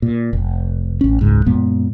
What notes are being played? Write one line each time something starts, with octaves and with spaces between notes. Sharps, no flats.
A#2
F1
A1 C#4
F#1 C#2 G#2
F#2 A#2 G#3 B3